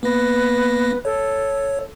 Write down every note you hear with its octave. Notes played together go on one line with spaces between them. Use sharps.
A#3 B3 B4 A#6
A4 C#5